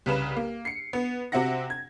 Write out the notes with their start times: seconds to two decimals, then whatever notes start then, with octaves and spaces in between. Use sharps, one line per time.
0.06 C2 C#3 B4 E7
0.36 A#3
0.65 C7 C#7
0.93 B3
1.32 C3 C4 F#4 E5 F#5 A#6
1.70 G#6